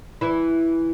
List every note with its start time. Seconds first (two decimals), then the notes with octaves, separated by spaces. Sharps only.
0.21 E3 E4